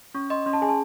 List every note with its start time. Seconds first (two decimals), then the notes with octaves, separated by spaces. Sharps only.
0.14 C#4 C#6
0.30 D#5 C6
0.46 C#4 C6
0.53 A5
0.62 G#4 G#5
0.69 A5